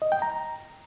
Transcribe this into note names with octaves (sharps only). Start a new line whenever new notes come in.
D#5
G5
A#5